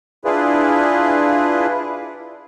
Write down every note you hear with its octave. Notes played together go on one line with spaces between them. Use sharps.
D4 E4 F4 G#4 B4